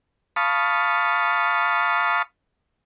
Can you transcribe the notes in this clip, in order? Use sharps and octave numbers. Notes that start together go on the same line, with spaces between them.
F5 A5 B5 C#6 D#6